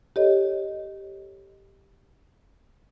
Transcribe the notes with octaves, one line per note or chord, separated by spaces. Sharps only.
G4 A4 C#5 D#5